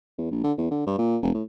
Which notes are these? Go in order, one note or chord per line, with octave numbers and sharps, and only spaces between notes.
E2
A#1
D3
E2
D3
G2
A#2
F1
A2